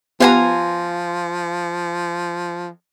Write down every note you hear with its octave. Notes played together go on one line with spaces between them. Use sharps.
F3 B3 F4 G4 B4 G#5 A#5